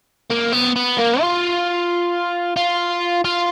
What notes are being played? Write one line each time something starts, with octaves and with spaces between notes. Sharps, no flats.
A#3
B3
B3
A#3
F4
F4
F4